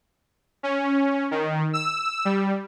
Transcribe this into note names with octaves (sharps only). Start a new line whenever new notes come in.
C#4
D#3
E6
G3